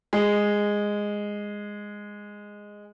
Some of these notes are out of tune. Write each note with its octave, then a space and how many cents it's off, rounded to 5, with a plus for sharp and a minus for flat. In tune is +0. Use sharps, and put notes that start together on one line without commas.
G#3 -10